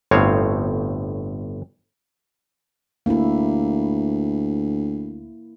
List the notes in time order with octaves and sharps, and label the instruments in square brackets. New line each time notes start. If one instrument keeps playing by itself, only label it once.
[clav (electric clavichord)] G1 A2 C4 C#5 F5
[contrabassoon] D2 [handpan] A#3 E4